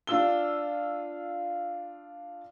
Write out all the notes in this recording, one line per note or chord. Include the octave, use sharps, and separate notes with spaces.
D4 F4 E6 G7